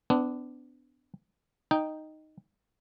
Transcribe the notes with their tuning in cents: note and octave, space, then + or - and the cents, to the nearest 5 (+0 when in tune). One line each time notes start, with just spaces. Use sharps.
B3 +35 D4 +0
D#4 -5 G5 +0